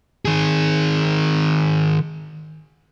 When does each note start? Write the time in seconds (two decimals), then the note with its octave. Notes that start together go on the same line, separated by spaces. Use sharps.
0.25 D#3 G#4